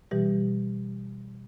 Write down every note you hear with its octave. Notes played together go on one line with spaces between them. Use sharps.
B2 E3 G3 G4